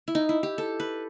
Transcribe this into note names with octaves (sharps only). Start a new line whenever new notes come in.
E4
D#4
E4
G4
A4
B4